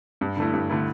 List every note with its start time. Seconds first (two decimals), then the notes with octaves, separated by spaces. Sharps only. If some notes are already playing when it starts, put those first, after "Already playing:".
0.21 G2
0.37 D3 A3 E4
0.53 G2
0.69 D3 A3 E4